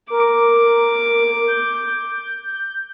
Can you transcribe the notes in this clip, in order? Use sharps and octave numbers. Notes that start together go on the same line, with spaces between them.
A#4 D6
G6